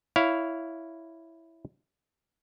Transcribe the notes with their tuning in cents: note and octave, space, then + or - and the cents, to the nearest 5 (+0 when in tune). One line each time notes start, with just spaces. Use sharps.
E4 +0 C#5 +20 F5 +0